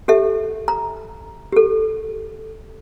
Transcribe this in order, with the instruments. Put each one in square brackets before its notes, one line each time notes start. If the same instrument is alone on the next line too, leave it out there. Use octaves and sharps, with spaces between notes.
[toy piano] G4 A4 E5
A#5
G4 A4